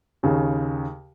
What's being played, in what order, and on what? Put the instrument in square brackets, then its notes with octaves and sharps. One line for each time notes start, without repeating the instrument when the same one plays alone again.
[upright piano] D#2 C#3